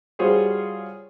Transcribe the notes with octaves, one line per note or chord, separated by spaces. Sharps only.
G3 F4 F#4 G#4 C5 C#5